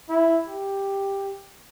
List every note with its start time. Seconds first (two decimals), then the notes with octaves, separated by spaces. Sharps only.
0.09 E4
0.47 G4